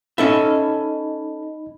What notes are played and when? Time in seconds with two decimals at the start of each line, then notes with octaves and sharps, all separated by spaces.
0.18 C#4 D#4 A4 D#5 E5 B5